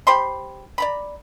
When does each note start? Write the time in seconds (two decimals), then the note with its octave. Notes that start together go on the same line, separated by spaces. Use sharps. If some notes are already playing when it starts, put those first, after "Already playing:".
0.07 G4 C5 B5 C6
0.78 D5 A#5 B5